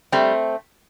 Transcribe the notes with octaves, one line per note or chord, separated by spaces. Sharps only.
G3 A3 C4